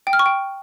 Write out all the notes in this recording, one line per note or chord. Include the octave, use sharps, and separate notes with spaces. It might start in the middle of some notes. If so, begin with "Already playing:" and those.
G5
F6
C#6
G5